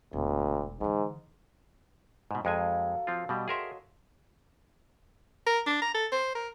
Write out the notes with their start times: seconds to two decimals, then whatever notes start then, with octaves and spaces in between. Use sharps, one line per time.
0.13 E1 D2
0.81 G#2 D3 E3
2.31 G#2 B2
2.45 F2 F#3 G#3 A4 F5 G#5
3.07 F3 C4 F4
3.29 B2 G3 D#5 G5 D#6
3.48 F#4 G#4 A#4 C#5 E5 C6
5.46 A#4
5.66 D4
5.82 A#5
5.95 A4
6.12 C5
6.35 A#4